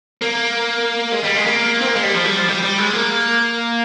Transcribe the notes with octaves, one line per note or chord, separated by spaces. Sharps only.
A#3
G#3
G3
G#3
A#3
C4
A#3
G#3
G3
F3
G3
F3
G3
G3
G#3
A#3